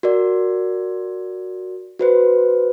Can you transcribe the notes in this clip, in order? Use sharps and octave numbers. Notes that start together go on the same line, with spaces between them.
F#4 A#4 D5
F#4 B4 C5